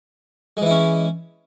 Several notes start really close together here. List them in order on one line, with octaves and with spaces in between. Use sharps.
G#3 E3 E4 C#4